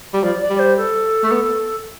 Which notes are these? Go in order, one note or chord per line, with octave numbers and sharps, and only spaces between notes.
G3
F3 D5
D5
G3
C5
A4
A3
B3